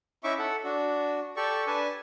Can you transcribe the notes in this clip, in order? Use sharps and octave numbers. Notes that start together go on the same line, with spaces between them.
C#4 D#4 E4 E5 C#6 D6
A4 F#5
D4 F#4
G4 A4 D5 C#6
D4 B4 G#5 A5